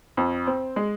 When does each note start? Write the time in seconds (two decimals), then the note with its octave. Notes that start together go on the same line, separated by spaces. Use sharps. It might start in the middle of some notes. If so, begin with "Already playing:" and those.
0.17 F2
0.47 C4
0.76 G#3